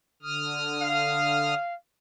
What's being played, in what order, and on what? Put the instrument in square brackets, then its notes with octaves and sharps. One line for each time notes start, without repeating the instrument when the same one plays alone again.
[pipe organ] D3 D#6 F6
[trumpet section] F5